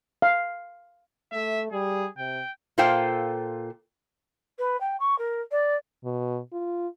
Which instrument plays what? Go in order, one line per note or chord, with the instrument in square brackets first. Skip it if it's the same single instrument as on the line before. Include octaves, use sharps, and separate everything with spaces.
[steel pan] F5
[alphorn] A3 [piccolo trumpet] E5
[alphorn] G3 [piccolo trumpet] G#4
[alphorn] C3 [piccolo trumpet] G5
[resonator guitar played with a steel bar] A#2 F4 A4 C5 F5 G5
[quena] B4
G5
C#6
A#4
D5
[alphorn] B2
F4